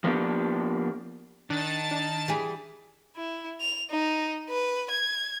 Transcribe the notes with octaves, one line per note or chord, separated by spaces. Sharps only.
F3 A#3 B3 D4 G4
D#3 D4 A5 F#6 A6
D4
E3 G3 G#4
E4
F7
D#4
B4
G#6